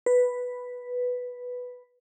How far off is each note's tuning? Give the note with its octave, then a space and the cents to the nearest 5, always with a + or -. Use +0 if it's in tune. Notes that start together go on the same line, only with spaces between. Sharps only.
B4 +0